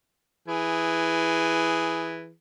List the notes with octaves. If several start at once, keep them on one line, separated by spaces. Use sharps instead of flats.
E3 G#4